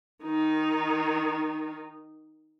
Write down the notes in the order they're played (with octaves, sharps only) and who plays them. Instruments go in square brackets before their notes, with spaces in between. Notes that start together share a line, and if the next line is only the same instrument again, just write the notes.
[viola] D#3 D#4